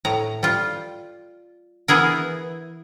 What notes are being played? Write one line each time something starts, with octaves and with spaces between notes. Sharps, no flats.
A2 A#5
G3 F4
E3 B3 E4 G#4 A#4